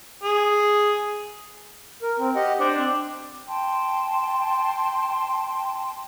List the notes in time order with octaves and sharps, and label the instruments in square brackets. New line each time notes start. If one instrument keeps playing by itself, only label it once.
[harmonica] G#4
[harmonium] A#4
C4
G4 D#5 F#5
[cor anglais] D4 [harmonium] C5
[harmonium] C4
[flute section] G5 A5 C6